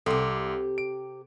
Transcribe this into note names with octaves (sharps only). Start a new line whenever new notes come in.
C2 C3 G4 A4 C6
D7